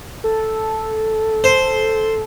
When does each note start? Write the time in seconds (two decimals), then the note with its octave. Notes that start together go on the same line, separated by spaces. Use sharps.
0.24 A4
1.44 C5